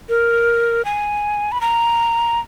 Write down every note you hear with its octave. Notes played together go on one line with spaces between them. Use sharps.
A#4
G#5
B5
A#5